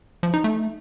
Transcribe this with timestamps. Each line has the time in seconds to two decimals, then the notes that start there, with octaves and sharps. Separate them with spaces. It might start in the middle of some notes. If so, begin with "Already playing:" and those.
0.23 F3
0.34 D#4
0.44 A3